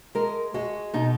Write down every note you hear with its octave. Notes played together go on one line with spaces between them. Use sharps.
G#3 A#4
G#3 F#4
B2 D#4